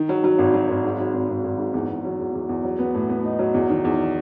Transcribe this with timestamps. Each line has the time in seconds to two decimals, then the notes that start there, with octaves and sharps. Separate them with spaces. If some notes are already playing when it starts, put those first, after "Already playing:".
Already playing: D#3
0.09 F#3
0.24 F#3
0.38 G#1
0.54 F#3
0.69 G#1
0.84 G#2
0.99 F#3
1.13 G#1
1.29 G#1
1.44 G#1
1.58 G#2
1.74 E2
1.89 E2
2.04 F#3
2.18 E2
2.34 E2
2.49 E2
2.64 F#3
2.79 B3
2.95 A2
3.09 B3
3.24 D#4
3.39 F#3
3.54 E2
3.69 D#3
3.85 E2